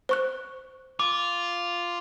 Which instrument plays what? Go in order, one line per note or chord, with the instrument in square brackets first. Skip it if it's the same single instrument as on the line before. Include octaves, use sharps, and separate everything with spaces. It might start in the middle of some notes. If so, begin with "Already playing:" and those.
[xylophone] C5 C#6 F#6
[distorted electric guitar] F4 [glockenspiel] D6